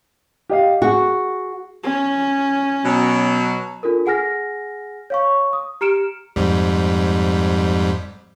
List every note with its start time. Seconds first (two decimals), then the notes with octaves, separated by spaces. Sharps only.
0.49 G4 D#5 F5
0.82 F#4 G#4
1.84 C#4
2.85 B2 F#3
3.83 D4 F4 A4 A#4
4.06 G#4 F#5 G#5 F6 A#6
5.10 C#5 F5 C#6
5.53 D#6
5.81 G4 A#5 F6 C#7 D7 E7
6.36 F2 G#2 G3